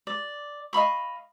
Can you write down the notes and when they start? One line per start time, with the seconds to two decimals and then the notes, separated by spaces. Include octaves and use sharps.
0.07 D5
0.73 D#5 F5 B5 C#6